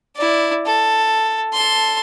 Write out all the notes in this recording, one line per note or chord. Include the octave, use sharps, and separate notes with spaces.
E4 D5
A4
A4 C6